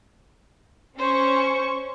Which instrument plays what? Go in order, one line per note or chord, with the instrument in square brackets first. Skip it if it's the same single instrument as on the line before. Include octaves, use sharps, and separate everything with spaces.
[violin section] C#4 C#6 [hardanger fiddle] C5